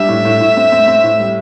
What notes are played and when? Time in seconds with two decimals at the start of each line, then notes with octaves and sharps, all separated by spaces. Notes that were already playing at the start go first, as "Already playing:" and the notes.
Already playing: G3 D4 E5
0.09 A2
0.25 A2
0.41 A2
0.57 C4
0.72 C4
0.88 C4
1.04 A2
1.20 G3